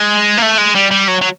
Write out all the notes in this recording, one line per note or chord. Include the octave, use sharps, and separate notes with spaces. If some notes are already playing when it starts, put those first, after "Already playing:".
Already playing: G#3
A#3
A3
G#3
G3
G3
F#3
F#3